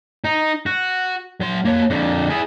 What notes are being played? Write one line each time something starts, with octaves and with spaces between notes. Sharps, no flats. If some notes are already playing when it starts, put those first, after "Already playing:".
D#4
F#4
F#3 C6
A#3 C#5
F2 D3
E4 G#4